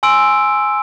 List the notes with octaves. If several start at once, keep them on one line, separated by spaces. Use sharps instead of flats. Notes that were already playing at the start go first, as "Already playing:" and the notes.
G#5 C6 E6 D7